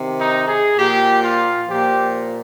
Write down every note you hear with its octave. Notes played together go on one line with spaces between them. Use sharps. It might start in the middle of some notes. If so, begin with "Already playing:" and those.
Already playing: C3 D#3
D#4
G#4
A#2 F3 G4
F4
A#2 F3 G4